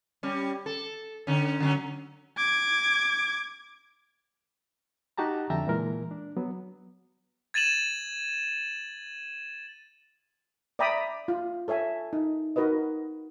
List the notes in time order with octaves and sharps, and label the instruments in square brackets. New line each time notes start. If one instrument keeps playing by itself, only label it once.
[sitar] G3 C#4
A4
D3 C#4
D3 F#3 C#4
[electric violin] D6 G#6
[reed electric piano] D#4 F#4 G4 A5 A#5
F2 D3 E5 G5 A5 A#5
A#2 E3 G#3 A#4
D4
F#3 B3
[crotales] G#6 A6 D#7 E7 F#7
[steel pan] D5 E5 G5 A#5 B5 D#6
F4
A4 C#5 E5 G#5
D#4
D#4 F#4 A#4 B4 D#5